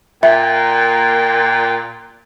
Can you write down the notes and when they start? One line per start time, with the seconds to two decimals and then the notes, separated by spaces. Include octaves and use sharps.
0.23 A#2 E5 G5